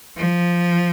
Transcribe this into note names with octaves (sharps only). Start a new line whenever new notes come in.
F3